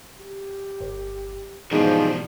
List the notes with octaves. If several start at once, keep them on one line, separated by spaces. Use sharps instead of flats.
G4
G1
G#2 B2 E3 F3 G3 G#3 B3